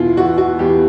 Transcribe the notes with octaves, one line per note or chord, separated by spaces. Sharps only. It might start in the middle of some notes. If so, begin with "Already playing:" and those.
Already playing: E2 B2 E4 F4
E2 F#4
F#4
E2 G4